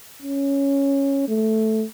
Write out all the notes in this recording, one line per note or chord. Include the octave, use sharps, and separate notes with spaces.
C#4
A3